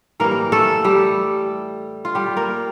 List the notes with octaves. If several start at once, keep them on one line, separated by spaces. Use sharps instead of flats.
A2 E3 G3 A#3 A#4
A3 A4
G3 G4
F4
G3 G4
A#3 A#4